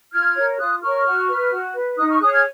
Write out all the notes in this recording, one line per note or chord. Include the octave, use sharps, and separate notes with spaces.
F4 F6 G#6
A#4 C#5
F4 D#6 F#6
A#4 C#5 C#6 F6
F#4
B4
F#4
B4
D#4 D#6 F#6
C#6 F6
G#4 C#5 D#6 F#6
F6 G#6